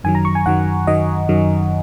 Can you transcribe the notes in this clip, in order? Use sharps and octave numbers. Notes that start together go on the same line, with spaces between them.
F#2 D#3 F#3 G#5
A#5
C#6
G#5
F#2 D#3 F#3 F#5
F#2 D#3 F#3 D#5
F#2 D#3 F#3